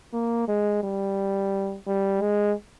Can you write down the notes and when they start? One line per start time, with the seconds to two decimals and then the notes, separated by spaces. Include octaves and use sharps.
0.13 A#3
0.48 G#3
0.83 G3
1.87 G3
2.21 G#3